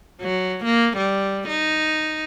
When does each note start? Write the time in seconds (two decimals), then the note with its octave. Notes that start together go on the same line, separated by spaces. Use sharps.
0.22 F#3
0.65 A#3
0.98 G3
1.49 D#4